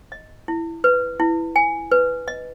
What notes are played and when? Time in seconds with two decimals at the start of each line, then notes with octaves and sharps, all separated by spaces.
0.12 D#5
0.48 E4
0.84 B4
1.20 E4
1.56 G#5
1.91 B4
2.28 D#5